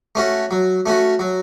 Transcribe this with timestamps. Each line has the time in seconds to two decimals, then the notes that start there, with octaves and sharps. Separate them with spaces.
0.15 A3 C#4 F#4
0.51 F#3
0.86 A3 C#4 F#4
1.19 F#3